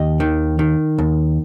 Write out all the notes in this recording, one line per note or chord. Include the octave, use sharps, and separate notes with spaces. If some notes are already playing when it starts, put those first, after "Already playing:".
Already playing: D#2 D#5
D#3
D#3
D#2